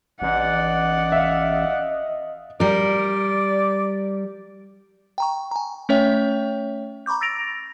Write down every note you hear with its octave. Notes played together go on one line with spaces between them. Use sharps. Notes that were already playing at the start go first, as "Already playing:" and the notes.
A1 D5 D#5 F#5
E5 F5
G3 A#4 D5
G5 A#5 C#6
G#5 A#5
A3 C#4 C#5 E5 G5
A#5 B5 C#6 D6 G6
E6 A6 A#6 D7 F7